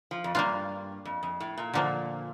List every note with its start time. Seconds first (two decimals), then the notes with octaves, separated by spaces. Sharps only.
0.11 F3
0.24 F2
0.35 G2 A#3 D4 F4
1.05 F2
1.23 F2
1.40 A2
1.58 A#2
1.74 A#2 D3 F3 A#3 D4